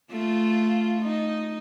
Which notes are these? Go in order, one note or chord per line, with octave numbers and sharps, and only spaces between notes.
A3 F4
D#4